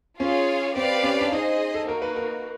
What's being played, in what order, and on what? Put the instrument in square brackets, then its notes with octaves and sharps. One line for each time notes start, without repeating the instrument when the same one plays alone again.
[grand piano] C#4 [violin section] F4 G#4 C#5
[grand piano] C4 [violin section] G4 B4 D5 F5
[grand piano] C#4
D4
[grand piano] D#4 [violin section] G#4 C5 D#5
[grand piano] A4
[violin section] A#3 D#4 F#4 [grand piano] A#4
[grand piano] B4
A#4